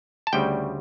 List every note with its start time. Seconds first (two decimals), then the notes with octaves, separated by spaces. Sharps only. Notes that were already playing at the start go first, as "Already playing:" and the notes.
0.27 A5
0.33 D2 C#3 G3 G5